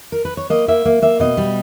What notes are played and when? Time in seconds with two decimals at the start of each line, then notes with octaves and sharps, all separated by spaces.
0.12 A#4
0.25 B4
0.37 C#5
0.50 A#3 D#5
0.68 A#3 E5
0.85 A#3
1.02 A#3 E5
1.20 B2 D#5
1.37 G3